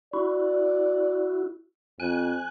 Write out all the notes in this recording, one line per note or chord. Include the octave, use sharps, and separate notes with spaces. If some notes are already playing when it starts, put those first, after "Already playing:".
E4 F#4 D5
F2 G#5 F#6